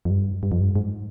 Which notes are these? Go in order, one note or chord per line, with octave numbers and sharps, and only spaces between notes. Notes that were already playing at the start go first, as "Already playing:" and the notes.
F2
G2
G2
F2
G2
G#2